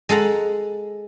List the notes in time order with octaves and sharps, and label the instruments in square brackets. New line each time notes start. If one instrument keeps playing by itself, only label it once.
[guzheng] G#3 A4 F#5 A#5